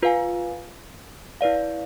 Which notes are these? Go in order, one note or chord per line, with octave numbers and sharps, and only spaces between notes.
F4 B4 F5 G#5
E4 B4 D5 F5